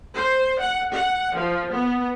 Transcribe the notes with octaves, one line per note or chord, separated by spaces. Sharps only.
C5
F#5
F#5
F3
B3